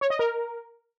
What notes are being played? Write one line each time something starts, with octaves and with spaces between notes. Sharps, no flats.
C#5
D#5
A#4